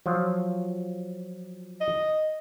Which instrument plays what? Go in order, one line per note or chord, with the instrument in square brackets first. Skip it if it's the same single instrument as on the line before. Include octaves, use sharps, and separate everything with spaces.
[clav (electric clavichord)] F3 F#3 F4
[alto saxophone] D#5